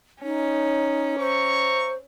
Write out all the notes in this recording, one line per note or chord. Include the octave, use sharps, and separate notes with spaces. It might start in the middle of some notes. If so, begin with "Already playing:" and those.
C#4 D#4
C5 E5 A#5 C#6